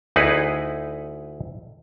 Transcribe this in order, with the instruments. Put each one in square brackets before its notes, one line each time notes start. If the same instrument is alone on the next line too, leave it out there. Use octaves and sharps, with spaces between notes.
[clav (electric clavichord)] D2 D#4 E4 G#4 B4 F#5